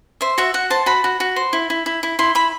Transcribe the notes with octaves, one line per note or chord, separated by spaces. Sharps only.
C5 E5
F#4 E5
F#4 F#5
C5 A5
F#4 B5
F#4
F#4
C5
E4
E4
E4
E4
E4 C6
E4 B5